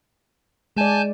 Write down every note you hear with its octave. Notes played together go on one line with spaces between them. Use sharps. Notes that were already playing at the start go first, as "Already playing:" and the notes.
G#3 D5 G#5 A5 G6